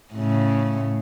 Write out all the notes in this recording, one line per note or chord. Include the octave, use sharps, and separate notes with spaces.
A2 C#3